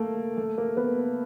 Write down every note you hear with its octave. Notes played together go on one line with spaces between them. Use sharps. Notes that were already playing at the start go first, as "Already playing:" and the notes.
Already playing: A3 A#3
A3
A#3
B3